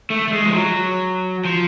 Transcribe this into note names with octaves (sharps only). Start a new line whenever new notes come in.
A3
A3
G#3
F3
F#3
F3